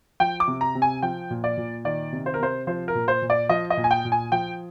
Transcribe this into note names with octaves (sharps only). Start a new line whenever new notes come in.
F3 G5
D6
C3
A#5
C3
G#5
F3 G5
A#2
D5
A#2
D#3 D5
C3
C5
A#4
C3 C5
F3 C5
A#4
A#2
C5
A#2
D5
F3 D#5
D#5
A#2
G#5
G5
A#2
G#5
F3 G5